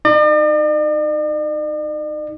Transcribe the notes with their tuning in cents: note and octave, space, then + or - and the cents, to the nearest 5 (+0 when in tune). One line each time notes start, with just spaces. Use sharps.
D#4 +0 D5 +45